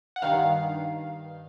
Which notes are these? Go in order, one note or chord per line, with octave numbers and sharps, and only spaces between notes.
F#5
G2 D#3 F5